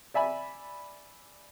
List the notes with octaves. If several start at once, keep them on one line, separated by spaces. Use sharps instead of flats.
D5 E5 G#5 B5